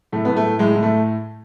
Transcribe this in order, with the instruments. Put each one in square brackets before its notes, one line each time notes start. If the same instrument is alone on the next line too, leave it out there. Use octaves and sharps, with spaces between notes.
[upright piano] A2 A3
A2 B3
A3
A2
A2 G#3
A2
A3